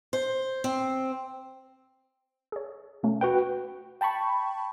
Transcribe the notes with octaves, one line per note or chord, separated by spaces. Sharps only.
C5
C4
G#4 C#5
B2 A3 C#4
F#4 B4 G5
G5 A5 B5 C#6